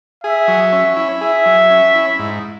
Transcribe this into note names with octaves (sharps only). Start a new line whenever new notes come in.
G#4 E5
F#3
C#4
E4
G#4 E5
F#3
C#4
E4
G#2